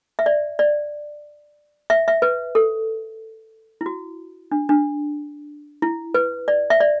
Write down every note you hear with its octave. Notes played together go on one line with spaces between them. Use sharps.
E5
D5
D5
E5
E5
B4
A4
E4
F#4
D4
D4
E4
B4
D5
E5
D5